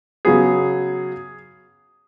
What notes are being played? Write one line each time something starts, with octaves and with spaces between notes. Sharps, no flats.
C#3 F#3 B3 G#4